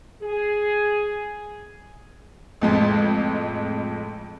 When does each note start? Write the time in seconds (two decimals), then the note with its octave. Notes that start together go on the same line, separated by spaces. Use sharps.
0.23 G#4
2.61 A1 F2 G#3